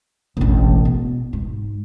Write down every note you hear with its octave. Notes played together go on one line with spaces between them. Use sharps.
E1 A1
B2
G#2